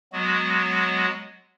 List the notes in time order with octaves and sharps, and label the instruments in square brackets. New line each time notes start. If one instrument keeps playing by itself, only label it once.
[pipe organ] F#3 G#3 B3 F#4